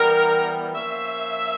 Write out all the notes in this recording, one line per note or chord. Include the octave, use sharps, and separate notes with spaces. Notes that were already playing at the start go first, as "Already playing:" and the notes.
Already playing: E3 G3 B3 A#4
F3 A#3 C#4 E5